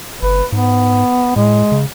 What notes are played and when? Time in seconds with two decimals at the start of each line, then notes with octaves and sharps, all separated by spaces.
0.23 G1 B4
0.52 G#2 B3
1.36 A2 G#3
1.72 C#3